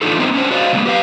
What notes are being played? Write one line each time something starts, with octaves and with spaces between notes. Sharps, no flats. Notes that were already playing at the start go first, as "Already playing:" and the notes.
E3 D4 D#4 F4 A4
B3 C4 D#4 C5
C#4 D4 C5
F#4 C5 D5 D#5 F5
C#3 G#3 A#3 B3
G4 B4 F5